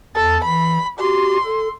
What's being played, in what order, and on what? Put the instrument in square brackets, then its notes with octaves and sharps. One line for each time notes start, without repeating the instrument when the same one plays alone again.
[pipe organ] E2 A6 [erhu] A4
[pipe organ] E3 [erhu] B5
[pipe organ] F#4 G4 [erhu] C6
[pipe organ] A4